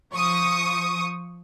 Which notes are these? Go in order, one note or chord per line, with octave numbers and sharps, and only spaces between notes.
F3 C#6 D#6